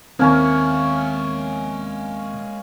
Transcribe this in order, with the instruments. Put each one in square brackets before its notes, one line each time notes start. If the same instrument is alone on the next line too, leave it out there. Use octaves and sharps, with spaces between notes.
[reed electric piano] D#2 D#3 C4 [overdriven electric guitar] G#3 E5 [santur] A#3 C#4 A#4